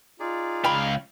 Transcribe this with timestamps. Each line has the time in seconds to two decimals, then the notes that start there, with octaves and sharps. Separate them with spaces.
0.20 D#4 F4 G#4 D5
0.64 C#2 F5 G5 B5